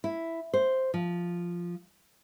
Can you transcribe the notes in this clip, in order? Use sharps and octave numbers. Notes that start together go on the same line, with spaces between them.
E4
C5
F3